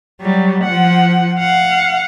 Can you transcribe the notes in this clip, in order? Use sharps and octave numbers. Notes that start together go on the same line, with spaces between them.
F#3 G3
F3 F#5
F5 F#5